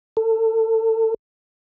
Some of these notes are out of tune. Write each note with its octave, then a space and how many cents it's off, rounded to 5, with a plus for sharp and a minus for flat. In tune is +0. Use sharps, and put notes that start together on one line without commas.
A4 +30